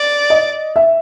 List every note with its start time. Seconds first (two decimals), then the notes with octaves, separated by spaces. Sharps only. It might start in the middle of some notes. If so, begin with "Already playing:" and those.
Already playing: D5
0.30 D#5
0.76 E5